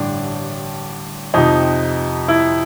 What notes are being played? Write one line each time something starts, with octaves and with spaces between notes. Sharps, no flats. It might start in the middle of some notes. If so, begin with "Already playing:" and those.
Already playing: A1 G2 D3 D4
F2 C3 F3 D#4
E4